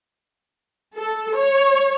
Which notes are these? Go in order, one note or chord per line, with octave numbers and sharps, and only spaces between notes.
A4
C#5